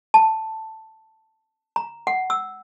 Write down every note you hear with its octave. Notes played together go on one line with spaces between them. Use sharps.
A5
A#5
F#5
E6